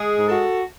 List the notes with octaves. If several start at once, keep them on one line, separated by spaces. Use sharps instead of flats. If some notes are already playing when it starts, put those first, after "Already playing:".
Already playing: G#3 G#4
G#2
F#4 A4